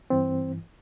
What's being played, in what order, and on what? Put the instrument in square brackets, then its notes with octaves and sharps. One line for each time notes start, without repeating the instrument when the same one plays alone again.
[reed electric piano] G2 E3 C4